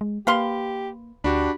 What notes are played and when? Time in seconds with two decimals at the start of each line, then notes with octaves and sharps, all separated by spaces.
0.01 G#3
0.27 A#3 G4 B4 F5 C6
1.24 D2 D4 F#4 G4 B5